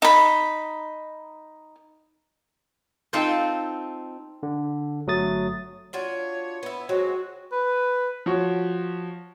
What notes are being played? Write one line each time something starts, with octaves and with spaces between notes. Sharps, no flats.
D#4 B5
C4 D#4 F4 A4 C5
D3
G1 F#3 A3 D#6 A6
D4 F4 F#4 C#5
B3 E4
F#3 G#3 C4 F#4
B4
F3 F#4 C#5